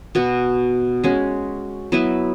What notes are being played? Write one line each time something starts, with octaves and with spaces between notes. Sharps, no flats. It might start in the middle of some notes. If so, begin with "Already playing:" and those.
B2 B3 F#4
G#3 C#4 F#4
F#3 B3 E4 B4